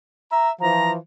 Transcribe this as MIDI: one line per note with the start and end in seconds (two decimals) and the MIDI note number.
0.30 0.50 76
0.30 0.50 82
0.61 0.95 52
0.61 0.95 53
0.61 0.91 82